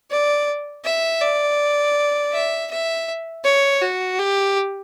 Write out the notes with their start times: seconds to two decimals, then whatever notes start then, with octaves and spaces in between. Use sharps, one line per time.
0.11 D5
0.85 E5
1.22 D5
2.33 E5
2.71 E5
3.44 C#5
3.82 F#4
4.19 G4